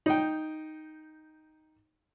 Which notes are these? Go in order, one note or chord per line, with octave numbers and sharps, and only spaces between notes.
D#4 G5